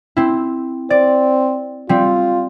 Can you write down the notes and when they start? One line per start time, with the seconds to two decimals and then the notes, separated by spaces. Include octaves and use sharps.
0.17 C4 E4
0.90 C4 D5
1.89 G3 C4 F4